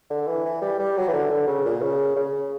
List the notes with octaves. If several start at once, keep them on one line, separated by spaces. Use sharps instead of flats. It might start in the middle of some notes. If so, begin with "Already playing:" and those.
D3
E3
E3
G3
G3
F#3
E3
D3
D3
C#3
A#2
C#3
C#3